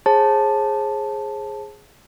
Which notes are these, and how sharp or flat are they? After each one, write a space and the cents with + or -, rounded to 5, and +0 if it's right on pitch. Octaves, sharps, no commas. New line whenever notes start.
G#4 +0 C5 +40 A5 +0